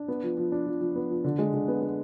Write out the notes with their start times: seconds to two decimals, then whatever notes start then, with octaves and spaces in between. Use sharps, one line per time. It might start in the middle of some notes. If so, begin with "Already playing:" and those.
Already playing: D4
0.08 B3
0.23 F3
0.37 F3
0.52 D4
0.66 F3
0.81 F3
0.95 B3
1.10 F3
1.24 D3
1.39 G#3
1.53 D3
1.68 B3
1.82 B3